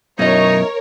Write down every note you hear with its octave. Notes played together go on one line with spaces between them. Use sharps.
B1 F#2 B2 D#4 E4 A#4 C#5 D#5